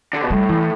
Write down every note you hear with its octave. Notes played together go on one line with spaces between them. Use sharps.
D3
B2
A2 G3
E3